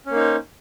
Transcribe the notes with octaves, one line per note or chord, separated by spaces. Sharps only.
A#3 C#4 D#4 C5